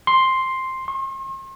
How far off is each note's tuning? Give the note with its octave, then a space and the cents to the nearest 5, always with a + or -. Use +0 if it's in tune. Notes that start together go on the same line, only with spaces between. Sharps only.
C6 +5
C6 +45